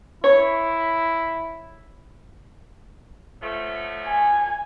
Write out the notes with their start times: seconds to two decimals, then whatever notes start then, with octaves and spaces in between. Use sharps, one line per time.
0.24 E4 C#5
3.42 F3 F#3 A3
4.06 G#5